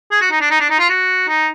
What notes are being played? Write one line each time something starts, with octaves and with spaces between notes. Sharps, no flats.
G#4
F#4
D#4
D4
D#4
D4
D#4
F4
F#4
D#4